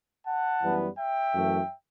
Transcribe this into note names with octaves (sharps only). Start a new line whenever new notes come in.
F#5 A5
F#2 E3 G3 B3
E5 G5
F#2 E3 A3